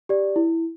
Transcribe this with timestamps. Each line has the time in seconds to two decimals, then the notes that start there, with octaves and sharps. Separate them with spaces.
0.09 G4 D5
0.36 E4